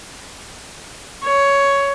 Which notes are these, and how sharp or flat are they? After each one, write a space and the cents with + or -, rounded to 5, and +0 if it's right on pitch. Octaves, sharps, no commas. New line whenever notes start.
C#5 +10